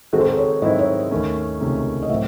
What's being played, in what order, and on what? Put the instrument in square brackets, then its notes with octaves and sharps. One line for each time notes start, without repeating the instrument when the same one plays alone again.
[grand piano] D#3 G#3 C4 D#4 F#4 [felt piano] A4
[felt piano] C5
A4
C#5
[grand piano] G#2 D#3 F#3 C4 E4 [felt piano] D#5
[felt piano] C#5
[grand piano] D#2 D#3 A3 C#4
C#2 C3 D#3 A3 C#4
[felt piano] D#5
[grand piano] A2 F#3 A3 C4 [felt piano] E5